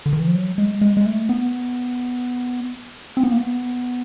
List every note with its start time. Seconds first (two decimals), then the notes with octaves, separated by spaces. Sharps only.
0.06 D3
0.13 D#3
0.20 E3
0.27 F3
0.35 F#3
0.58 G#3
0.81 G#3
0.97 G#3
1.06 A3
1.29 B3
3.17 C4
3.24 B3
3.31 A#3
3.37 B3